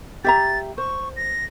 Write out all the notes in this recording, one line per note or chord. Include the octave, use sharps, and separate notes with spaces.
G4 E5 A#5 A6
C5 C#6
A#6